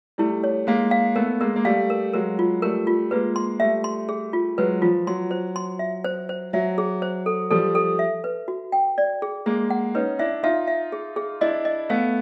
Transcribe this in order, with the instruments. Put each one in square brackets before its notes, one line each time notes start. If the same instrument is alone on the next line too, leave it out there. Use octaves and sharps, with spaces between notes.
[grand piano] G3 A3 [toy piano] E4
[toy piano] C#5
[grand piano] G#3 A#3 [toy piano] F5
[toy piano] F5
[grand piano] A3 B3 [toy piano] A#4
[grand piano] G#3 A#3 [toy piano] A#4
[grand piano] A#3
[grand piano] G3 A3 [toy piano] F5
[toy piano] A#4
[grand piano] F#3 G#3 [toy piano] A#4
[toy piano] F4
[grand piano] G3 A3 [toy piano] A#4
[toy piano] F4
[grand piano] G#3 A#3 [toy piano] B4
[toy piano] C6
[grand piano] G3 A3 [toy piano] E5
[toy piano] C6
G#4
F4
[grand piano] F#3 G#3 [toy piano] B4
[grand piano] F3 [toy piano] F4
[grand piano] F#3 [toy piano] C6
[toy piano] C5
C6
E5
C5
C5
[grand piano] F#3 [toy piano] E5
[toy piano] G#4
C5
A4
[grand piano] F3 G3 [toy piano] A4
[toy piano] A4
E5
B4
F#4
G5
D5
G#4
[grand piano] G#3 A#3 [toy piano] G#4
[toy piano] F#5
[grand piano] C#4 D#4 [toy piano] B4
[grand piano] D4 E4 [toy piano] E5
[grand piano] D#4 F4 [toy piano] E5
[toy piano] E5
G#4
G#4
[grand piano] D4 E4 [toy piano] D#5
[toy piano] D#5
[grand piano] A3 B3 [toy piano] F5